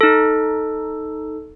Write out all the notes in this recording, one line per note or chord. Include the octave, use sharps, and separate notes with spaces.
D#4 A4